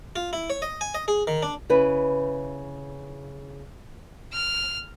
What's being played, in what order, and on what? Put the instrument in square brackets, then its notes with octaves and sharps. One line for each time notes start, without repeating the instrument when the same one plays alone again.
[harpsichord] F4
E4
C#5
D#5
G#5
D#5
G#4
D#3
D4
[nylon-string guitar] C#3 E4 B4
[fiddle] F6